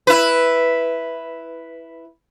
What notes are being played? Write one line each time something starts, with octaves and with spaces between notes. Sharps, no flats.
E4 B4